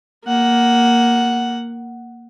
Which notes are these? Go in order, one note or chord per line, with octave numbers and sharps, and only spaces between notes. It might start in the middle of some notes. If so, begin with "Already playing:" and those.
A#3 F#5